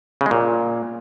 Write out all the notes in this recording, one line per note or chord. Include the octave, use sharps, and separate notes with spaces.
C#3
G#3
A#2